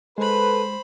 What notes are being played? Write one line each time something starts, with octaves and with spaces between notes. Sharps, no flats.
G#3 A4 B4 C5 B5